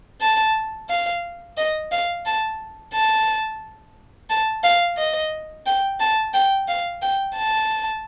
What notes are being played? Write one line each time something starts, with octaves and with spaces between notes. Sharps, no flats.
A5
F5
D#5
F5
A5
A5
A5
F5
D#5
G5
A5
G5
F5
G5
A5